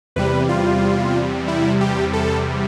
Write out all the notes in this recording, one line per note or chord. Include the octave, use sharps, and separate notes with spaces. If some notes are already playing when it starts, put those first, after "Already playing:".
E2 C3 G3 B4
F4
E4
G4
A4